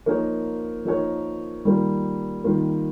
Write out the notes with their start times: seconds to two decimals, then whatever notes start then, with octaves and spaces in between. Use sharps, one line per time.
0.06 F3 A#3 D#4 A#4 C#5
0.85 F3 A#3 D#4 A#4 C#5
1.65 D#3 G3 A#3 F4
2.44 D#3 G3 A#3 F4